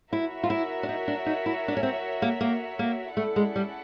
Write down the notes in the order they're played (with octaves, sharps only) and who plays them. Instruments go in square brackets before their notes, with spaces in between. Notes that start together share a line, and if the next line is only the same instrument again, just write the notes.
[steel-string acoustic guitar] E4 [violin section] F#4 A#4 C#5 E5
[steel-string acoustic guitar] F4
E4
D4
D#4
D4
D#4
E4
D4
C#4
C4
A#3
A#3
A#3
[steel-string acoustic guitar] A3 [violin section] C#4 E4 A4 D5 F#5
[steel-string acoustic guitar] G#3
G3